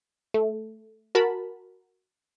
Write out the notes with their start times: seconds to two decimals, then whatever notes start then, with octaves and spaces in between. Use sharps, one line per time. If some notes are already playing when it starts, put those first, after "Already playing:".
0.34 A3
1.15 F#4 A#4 A5 B5